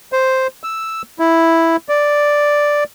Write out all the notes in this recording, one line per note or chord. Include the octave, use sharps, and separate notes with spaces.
C5
E6
E4
D5